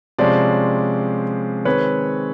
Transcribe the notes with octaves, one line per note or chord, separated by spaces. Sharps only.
C3 F3 G#3 C#4 C5 D5
D#3 G#3 C4 B4 C#5